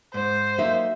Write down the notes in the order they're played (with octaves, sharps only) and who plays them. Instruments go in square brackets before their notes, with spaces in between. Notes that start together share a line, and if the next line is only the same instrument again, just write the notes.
[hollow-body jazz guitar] G#2 [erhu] C5
[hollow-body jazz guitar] F#3 A#3 D#4 [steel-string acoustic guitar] E5